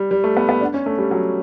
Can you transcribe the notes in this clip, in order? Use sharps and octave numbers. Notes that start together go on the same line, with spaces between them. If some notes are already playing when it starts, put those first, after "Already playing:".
Already playing: G3
G3
A3
B3
B3
D4
C#4
A3
G3
F#3